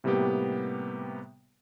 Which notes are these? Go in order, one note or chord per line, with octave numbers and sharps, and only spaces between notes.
A2 C3 G3 A#3 B3 G4